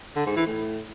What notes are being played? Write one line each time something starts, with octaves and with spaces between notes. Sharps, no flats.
D3
G#2
E3
A2